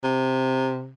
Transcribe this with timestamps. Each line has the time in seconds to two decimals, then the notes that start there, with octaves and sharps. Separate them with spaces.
0.04 C3